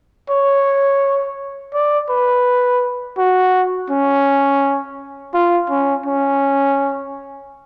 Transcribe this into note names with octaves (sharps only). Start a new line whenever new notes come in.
C#5
D5
B4
F#4
C#4
F4
C#4
C#4